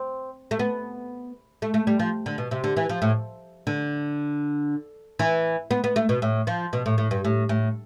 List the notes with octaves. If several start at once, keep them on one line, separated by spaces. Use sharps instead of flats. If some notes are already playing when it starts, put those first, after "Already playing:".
Already playing: C4
A3
B3
A3
A3
G3
F3
D3
B2
C3
D3
E3
F3
A2
D3
E3
B3
B3
A3
B2
A2
F3
B2
A2
A2
G2
A2
A2